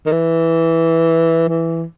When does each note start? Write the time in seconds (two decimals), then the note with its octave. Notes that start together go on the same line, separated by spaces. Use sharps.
0.06 D#3
0.12 E3
1.48 E3